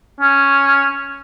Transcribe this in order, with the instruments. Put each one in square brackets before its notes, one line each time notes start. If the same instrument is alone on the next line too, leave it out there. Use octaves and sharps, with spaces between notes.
[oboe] C#4